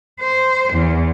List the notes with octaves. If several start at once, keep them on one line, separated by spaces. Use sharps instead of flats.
C5
E2